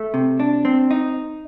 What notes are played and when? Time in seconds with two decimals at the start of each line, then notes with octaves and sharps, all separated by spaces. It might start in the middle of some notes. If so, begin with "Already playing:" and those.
Already playing: A3
0.14 C3
0.40 D4
0.65 C4
0.91 D#4